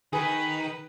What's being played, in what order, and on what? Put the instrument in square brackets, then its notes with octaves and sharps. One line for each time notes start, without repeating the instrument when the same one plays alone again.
[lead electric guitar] D#3 [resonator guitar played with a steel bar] G#4 [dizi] B4